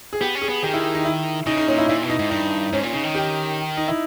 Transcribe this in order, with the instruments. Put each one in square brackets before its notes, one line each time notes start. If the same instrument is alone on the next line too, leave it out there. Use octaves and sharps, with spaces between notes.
[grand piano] G#4
[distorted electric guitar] B3 [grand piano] G4
[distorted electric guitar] C#4
[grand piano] G#4
[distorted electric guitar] B3
[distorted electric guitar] D#3 [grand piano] G4
[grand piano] E4
D#4
E4
[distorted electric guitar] C#3 [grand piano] D#4
[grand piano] D#4
[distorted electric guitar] A#2 [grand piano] C#4
[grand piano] E4
[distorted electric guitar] A#2 [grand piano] E4
[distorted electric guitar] B2
[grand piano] D#4
[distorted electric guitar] G#2
[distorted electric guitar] G2 [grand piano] D#4
[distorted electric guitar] G#2 [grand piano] C#4
[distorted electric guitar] A#2
[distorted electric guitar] C#3 [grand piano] D#4
[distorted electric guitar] D#3
[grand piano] G4
D#4
E4